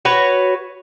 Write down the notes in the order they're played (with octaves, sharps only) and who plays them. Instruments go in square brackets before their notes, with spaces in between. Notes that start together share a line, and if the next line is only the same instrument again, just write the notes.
[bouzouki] F#4 B4 C#5